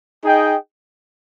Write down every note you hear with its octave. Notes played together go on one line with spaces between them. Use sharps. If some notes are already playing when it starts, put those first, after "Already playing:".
D#4 G#4 D#5 G5